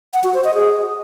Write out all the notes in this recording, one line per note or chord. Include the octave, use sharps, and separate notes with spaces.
F#5
F#4
C5
D#5
G#4